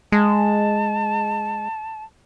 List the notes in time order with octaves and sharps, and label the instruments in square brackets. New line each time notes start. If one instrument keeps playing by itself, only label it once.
[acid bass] G#3 [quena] A5